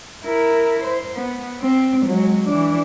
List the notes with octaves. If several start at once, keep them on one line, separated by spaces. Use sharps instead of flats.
E4 A#4
C5
B3
C4
F#3 G#3
E3 D4